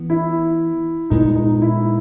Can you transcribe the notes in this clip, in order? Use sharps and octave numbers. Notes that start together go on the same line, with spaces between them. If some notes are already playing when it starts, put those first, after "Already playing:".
Already playing: E3 B3
E4
A#2 G#3 B3 D#4
D#4
E4